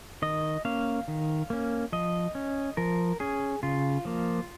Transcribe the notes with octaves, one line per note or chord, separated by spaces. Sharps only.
D#3 D#5
A#3 C#4 F5
D#3
A#3 C#4
F3 D#5
C#4
F3 A#4
C#4 G#4
C#3 F4
F3 A#3